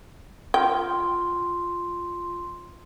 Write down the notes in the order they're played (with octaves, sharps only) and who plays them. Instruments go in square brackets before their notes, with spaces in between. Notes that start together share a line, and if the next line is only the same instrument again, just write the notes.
[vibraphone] F4 C6 [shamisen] G5